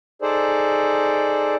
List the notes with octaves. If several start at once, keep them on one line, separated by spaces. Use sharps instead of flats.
D#4 G#4 A4 C5 D5